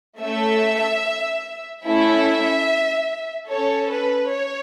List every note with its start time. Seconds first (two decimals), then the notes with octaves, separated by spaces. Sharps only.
0.21 A3 C#4 A4 E5
1.85 A3 C#4 E4 A4 E5
3.49 C#4 A4 C#5
3.91 B4
4.32 C#5